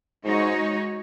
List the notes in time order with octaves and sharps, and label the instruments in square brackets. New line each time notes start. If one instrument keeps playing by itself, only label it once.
[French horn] G#2 [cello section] G#3 D#4 F#4 C#5